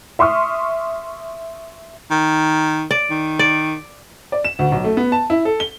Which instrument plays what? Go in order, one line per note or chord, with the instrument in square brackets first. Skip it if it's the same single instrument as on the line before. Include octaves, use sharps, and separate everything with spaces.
[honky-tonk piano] E5 C6 C#6 D#6 F6
[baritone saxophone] D#3
[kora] D5
[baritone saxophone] D#3
[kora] D5
[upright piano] D5
E7
D2
B1
A3
B3
A5
E4
A4
G7